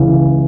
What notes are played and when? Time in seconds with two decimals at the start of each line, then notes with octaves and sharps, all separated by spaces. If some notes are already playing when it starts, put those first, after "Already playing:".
Already playing: C#2 C#3 E3